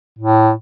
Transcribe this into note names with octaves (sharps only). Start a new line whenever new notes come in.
A2